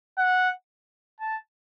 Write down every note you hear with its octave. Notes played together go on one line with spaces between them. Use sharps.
F#5
A5